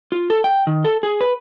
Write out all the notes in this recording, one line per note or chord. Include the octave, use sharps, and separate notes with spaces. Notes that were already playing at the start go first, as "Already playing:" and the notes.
F4
A4
G5
D#3
A4
G#4
B4